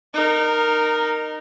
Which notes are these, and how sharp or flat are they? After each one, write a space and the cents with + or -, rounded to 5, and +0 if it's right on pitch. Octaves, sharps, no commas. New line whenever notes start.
D#4 -20 A#4 +0